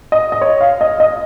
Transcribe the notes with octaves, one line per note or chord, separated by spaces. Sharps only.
D#5
D#5
C#5
F5
D#5
D#5